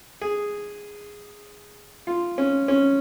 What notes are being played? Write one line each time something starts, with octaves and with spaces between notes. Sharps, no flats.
G#4
F4
C#4
C#4